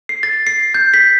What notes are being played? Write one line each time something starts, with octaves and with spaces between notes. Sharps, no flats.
C7
A6
C7
G6
B6